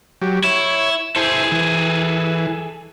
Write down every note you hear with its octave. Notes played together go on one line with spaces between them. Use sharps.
F#3 G4
E4 C#5
E4 G#4 A4 C5
E3